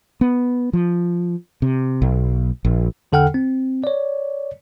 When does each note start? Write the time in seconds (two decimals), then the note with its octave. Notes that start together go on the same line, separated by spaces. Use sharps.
0.21 B3
0.73 F3
1.62 C3
2.02 B1
2.65 A#1
3.12 E2 D3 A4 F#5 G5 F6
3.34 C4
3.84 C#5 D5